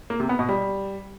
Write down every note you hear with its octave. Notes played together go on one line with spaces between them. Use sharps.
A#3
C3
B3
B2
G3